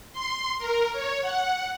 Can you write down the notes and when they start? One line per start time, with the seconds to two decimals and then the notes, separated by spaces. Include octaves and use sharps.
0.13 C6
0.58 A#4
0.93 C#5
1.21 F#5